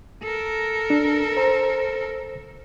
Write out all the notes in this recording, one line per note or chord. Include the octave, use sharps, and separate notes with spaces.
A4 A#4
D4
C5 A#5